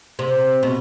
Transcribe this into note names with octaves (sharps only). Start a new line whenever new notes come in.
C3
B2